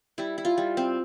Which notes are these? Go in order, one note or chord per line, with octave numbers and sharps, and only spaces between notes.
G3 E4
E4
F4
G3
C4